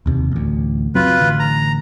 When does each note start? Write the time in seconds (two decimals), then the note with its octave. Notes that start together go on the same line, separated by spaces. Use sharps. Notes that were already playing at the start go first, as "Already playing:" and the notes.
0.06 E1 D#2 C3
0.32 A1 D2
0.95 F#1 F#3 C4 F4 B4
1.19 A1 D3
1.39 A#5